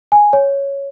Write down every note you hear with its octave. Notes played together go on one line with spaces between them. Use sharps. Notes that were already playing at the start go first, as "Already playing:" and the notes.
G#5
C#5